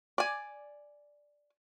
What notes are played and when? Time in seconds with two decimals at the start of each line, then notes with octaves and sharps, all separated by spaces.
0.18 D5 G#5